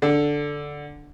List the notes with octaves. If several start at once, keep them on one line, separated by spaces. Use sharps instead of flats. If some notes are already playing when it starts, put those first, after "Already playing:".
D3